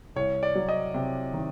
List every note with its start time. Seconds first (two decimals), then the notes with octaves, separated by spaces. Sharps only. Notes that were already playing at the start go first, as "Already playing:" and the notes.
0.16 C2 C#5
0.43 D5
0.55 F#3
0.69 D#5
0.94 C3
1.34 D#3